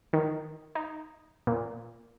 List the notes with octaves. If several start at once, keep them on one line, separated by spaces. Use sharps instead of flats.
D#3
D#4
A#2